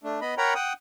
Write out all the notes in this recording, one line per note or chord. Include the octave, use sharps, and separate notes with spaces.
A3 D4
B3 D#5 B5
A#4 C#5 F#5 G5 A#5 B5
F#5 G5 D#6